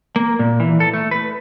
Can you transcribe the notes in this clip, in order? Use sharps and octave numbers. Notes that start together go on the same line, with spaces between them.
A#3
A#2
E3
A4
A3
B4